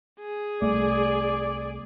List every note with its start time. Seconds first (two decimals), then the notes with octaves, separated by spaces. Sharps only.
0.19 G#4
0.62 C2 A3 D5